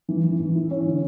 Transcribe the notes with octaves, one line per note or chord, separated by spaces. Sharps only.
E3
E3
E3
E4
C#4
D3